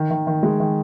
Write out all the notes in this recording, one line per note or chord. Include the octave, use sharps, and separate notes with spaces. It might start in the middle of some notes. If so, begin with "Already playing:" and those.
Already playing: D#3
D#3
D#3
G#3
D#3